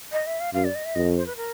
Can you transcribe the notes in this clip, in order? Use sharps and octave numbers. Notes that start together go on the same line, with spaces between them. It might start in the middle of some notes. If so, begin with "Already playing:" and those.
D#5
E5
F5
F#2 F5
D5
D#5
E5
F2 D#5
C5
B4
A#4